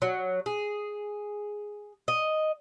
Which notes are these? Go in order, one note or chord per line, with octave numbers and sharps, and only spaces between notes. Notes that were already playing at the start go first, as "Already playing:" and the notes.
F#3
G#4
D#5